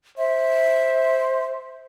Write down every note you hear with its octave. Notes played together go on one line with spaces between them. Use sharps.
C5 E5